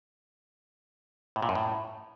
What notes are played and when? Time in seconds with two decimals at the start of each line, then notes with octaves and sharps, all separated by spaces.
1.36 A2
1.42 A#2
1.49 F#2
1.55 A2